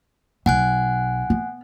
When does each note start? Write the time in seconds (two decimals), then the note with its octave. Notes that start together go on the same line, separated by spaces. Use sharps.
0.46 B1 F#5 G#5 F#6
1.30 B3